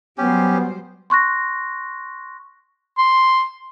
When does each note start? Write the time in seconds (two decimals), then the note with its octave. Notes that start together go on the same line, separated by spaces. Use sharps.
0.18 F#3 G3 B3 C#4 G4 C5
1.10 C6 C#6 F#6 A#6
2.98 C6